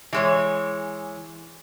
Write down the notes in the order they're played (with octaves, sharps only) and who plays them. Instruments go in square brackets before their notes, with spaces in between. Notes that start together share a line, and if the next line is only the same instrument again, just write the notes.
[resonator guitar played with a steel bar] E3 G#3 C#5